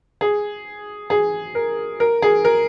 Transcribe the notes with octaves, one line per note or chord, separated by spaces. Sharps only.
G#4
G#4
A#4
A#4
G#4
A#4